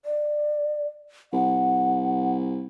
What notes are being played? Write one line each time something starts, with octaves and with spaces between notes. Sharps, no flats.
D5
C2 F#5